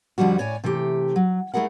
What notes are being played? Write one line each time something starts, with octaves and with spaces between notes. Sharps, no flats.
F2 D3 F3 G3 F#4
A2 C#5 D5 G#5
C3 E3 A3 G4
F#3
A3 E4 G#4 A#4 F#5